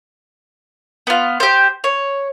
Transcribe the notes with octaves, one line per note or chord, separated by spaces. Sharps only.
B3 F4
G4 C5
C#5